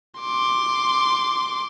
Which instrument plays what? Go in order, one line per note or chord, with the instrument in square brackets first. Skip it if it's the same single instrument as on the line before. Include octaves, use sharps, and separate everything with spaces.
[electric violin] C6 D6